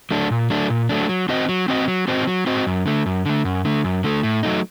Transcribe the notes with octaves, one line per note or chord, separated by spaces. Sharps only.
F#3 A3 D4
A#2
F#3 A3 D4
A#2
F#3 A3 D4
F#3
C4 F#4 C5 D#5
F#3
C4 F#4 C5 D#5
F#3
C4 F#4 C5 D#5
F#3
C4 F#4 C5 D#5
F#2
D3 A3
F#2
D3 A3
F#2
D3 A3
F#2
D3 A3
A2
F#3 A3 D#4